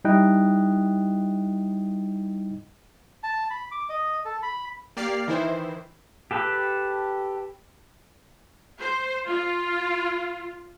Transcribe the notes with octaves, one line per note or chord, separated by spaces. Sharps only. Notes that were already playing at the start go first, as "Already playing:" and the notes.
G3 D#4 E4 D#5 G5 F#6
A5
B5
D6
D#5
A4
B5
A#3 G4 D5 F6 C7
D#3 E3 E4 C5
G4 A4 B4
C5
F4